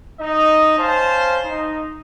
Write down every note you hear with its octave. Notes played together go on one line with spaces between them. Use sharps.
D#4 D#5
C#4 C5 F5 A5
D#4